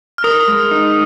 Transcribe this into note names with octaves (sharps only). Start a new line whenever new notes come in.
F6
A#4 D#6
G#3
D#4